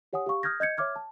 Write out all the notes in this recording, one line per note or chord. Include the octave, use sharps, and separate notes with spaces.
G4 C#5 F#5 G#5 D#6
G4 F5 C#6
D#6 F6 G6 G#6 A#6
D#5 G6 G#6 C#7
C#5 E5 D6 F6 G#6
A5